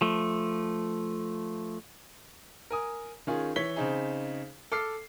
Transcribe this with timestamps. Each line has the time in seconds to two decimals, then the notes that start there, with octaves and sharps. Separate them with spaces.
0.01 F3 A3
2.71 A#4 G#5 D#6
3.27 D#3 C#4 F4 G#4
3.56 E3 C#5 B6 G7
3.76 C#3 C4 D#4 G#4
4.72 A4 D6 F6 C7